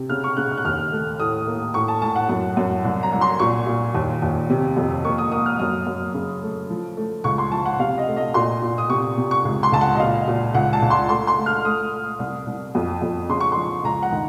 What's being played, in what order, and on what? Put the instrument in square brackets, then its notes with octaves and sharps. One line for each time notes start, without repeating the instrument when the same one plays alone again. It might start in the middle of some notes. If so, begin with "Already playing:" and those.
Already playing: [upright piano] C3
C#3 F6
C#6
C#3 F#6
F6
F#6
D#2 F6
A3
A2 D#6
A#3
A2 C#6
A5
A2 A5
F#5
F#2
F#2
C2
A#5
C2
C6
A#2 C#6
A#2
D#2
D#2
C3
F2
A#3 C#6
D#6
A#3 D#6
F6
F#2 D#6
F#2
C#3
A3
F3
A3
C#2 C#6
C6
F3 A5
F#5
C3 F5
D#5
A3
D#5
A#2 C6
A#2
D#6
C3 C#6
C3
C#6
C#2
C6
C#2 A5
F#5
D#5
A#2 F5
A#2
C#2 F#5
A5
C#2
C6
A3 C6
C6
A3
F6
A3 D#6
A3
C2
C2
F2
F2
C#3 C6
C#6
F3 C6
C#2 A#5
F#5
D#3